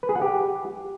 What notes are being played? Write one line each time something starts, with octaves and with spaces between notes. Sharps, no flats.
B4
G#4
F#5
G4